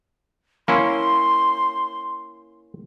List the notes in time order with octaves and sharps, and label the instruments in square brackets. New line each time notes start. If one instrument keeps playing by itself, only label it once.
[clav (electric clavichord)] A#3 C#4 E4 [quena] C6